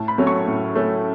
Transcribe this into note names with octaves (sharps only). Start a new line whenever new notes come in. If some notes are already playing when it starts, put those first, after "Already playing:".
Already playing: A2 A5
B5
F#3 A3 C#4
C#6
A2
F#3 A3 C#4